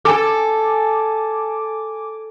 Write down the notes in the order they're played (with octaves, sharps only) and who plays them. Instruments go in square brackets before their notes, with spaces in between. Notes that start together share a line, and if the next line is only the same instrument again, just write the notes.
[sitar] A4 [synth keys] G#5 D6